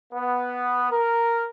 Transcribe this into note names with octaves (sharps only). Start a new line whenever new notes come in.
B3
A#4